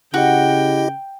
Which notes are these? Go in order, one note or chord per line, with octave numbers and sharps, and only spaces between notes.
C#3 E4 F#4 G4 D#5 F#5 G5